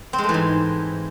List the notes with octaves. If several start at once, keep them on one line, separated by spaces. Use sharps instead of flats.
C4
G#3
A3
E3
G#2